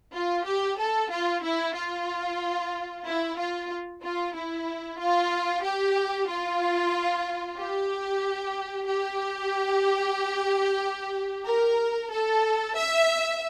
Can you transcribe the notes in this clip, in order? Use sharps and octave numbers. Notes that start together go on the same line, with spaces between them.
F4
G4
A4
F4
E4
F4
E4
F4
F4
E4
F4
G4
F4
G4
G4
A#4
A4
E5